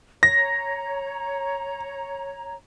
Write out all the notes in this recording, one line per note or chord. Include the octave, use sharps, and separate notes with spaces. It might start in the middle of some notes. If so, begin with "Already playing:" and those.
C#5 A#5 A#6